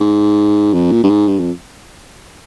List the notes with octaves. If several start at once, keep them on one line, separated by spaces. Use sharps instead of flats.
G#2
F2
A#2
G2
G#2
G2
F2